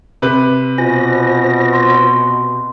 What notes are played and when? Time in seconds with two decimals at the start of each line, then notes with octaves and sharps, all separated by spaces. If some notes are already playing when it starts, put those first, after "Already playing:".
0.22 C3 B4
0.78 B2 F4 C5 G#5 A#6
1.73 C6